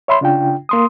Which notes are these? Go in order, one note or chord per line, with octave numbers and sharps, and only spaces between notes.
C#5 E5 B5 C6
C#3 D4 F4 G5
A#3 C6 D#6